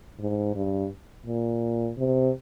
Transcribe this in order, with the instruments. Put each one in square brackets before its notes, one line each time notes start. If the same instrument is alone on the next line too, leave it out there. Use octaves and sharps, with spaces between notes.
[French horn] G#2
G2
A#2
C3